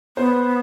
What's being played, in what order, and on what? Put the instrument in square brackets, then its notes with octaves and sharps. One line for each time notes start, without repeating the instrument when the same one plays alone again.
[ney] B3 [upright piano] C5